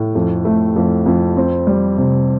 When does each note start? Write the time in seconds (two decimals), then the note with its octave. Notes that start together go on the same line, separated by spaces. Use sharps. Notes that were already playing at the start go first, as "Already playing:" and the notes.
Already playing: A2
0.15 F2
0.45 A3
0.76 F2
1.06 F2
1.37 C4
1.67 G3
1.98 C3